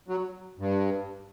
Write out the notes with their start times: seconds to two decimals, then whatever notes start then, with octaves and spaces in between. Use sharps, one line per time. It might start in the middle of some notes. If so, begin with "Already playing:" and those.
0.08 F#3
0.59 G2